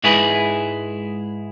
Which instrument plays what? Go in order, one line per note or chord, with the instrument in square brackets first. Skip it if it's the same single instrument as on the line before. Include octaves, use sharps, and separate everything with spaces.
[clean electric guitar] G#2 G#3 E4 G#4 B4